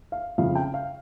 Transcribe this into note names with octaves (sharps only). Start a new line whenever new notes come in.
F5
F2 C#3 F3 F5
G5
F5